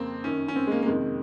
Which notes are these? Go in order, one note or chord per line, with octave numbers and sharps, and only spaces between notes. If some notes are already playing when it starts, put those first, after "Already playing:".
Already playing: F2 C#3 A#3 C4
F#2 D#3 C#4
C#4
C4
G#3
A#3
A#3
F2 C3 D#3 G#3